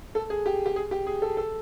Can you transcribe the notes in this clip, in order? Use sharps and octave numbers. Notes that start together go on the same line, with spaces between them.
A4
G#4
G4
G4
G#4
G4
G#4
A4
A4